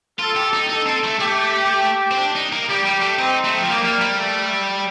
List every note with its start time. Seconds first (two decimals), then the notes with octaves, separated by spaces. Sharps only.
0.19 F4 A4
0.36 G4
0.54 D#4
0.69 D#4 A4
0.86 C4
1.03 A3
1.19 A3 G4
2.11 C4
2.19 D4
2.36 D#4
2.52 A#3
2.69 G3 G4
2.85 G3
3.02 A3
3.19 C4 D#4
3.44 A3
3.57 F3
3.68 G3 A#3
3.85 G3
4.01 G3
4.19 A3